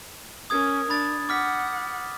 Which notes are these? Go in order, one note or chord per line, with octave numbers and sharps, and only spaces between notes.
C#4 A#4 D#6 G#6
D4 B5 A6
F#5 D6 F6 B6